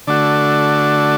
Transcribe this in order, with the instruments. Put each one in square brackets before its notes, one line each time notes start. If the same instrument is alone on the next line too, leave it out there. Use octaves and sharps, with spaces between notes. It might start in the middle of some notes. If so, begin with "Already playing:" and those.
[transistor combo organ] D3 A3 D4 F#4